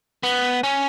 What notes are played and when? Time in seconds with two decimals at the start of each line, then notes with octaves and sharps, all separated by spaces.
0.23 B3
0.64 C#4